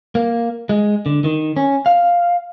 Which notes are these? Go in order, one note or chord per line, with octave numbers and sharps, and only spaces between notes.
A#3
G#3
D3
D#3
C#4
F5